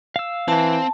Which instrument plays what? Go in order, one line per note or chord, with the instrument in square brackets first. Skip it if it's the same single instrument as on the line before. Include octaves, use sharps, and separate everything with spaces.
[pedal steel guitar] F5 E6
[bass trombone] E3 [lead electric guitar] C4 [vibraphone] A5